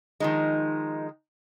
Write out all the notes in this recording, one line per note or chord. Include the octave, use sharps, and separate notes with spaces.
D#3 F3 G#3 D#4